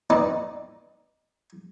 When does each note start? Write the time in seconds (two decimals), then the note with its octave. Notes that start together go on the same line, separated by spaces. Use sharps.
0.10 C4 D#4 B4 D5